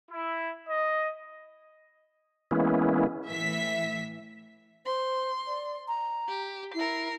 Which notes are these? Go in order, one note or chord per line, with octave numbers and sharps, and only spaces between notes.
E4
D#5
E3 G#3 A#3 B3 C#4 E4
A2 E3 E5 B6
C5 C6
D5
A#5
G4
E4 A#4 C7